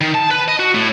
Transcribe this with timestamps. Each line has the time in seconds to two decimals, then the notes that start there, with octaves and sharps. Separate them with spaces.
0.01 D#3
0.15 A5
0.31 B4
0.48 D#5
0.60 F#4
0.75 A2